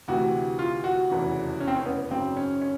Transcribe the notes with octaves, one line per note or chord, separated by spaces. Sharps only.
D2 C3 E3 F#4
F4
F#4
F1 E2 C#3 E3
C#4
C4
C#4
B3
G#1 F#2 C#3 F#3 C4
C#4
C#4